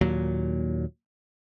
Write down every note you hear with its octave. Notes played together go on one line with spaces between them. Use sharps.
D#2 A#2 F#3